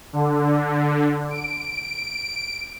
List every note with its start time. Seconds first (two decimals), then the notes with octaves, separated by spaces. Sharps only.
0.13 D3
1.31 D7